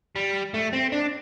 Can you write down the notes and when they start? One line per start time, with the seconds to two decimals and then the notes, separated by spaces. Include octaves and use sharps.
0.16 G3
0.54 A3
0.73 C4
0.92 D4